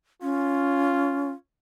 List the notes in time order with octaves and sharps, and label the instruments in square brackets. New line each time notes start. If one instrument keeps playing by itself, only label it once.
[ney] C#4 [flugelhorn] F4